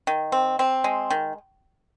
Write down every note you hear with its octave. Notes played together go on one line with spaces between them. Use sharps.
D#3
C4
C4
G#3
D#3